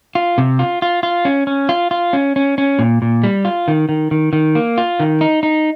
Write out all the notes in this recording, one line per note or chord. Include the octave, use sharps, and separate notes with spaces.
F4
C3
F4
F4
F4
C#4
C#4
F4
F4
C#4
C#4
C#4
A#2
A#2
G3
F4
D#3
D#3
D#3
D#3
A#3
F4
D#3
D#4
D#4